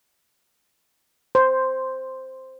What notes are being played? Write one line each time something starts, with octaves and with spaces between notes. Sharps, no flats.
C5